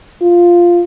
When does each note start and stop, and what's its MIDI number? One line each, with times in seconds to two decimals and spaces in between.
0.22 0.82 65